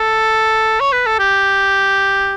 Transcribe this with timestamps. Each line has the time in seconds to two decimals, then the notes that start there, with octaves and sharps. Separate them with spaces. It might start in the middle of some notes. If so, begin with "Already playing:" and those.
Already playing: A4
0.80 C#5
0.93 B4
1.06 A4
1.19 G4